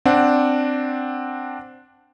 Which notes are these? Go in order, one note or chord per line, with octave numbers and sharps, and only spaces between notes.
C4 D4 F#5